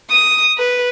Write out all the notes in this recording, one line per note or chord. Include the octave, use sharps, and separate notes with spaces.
D#6
B4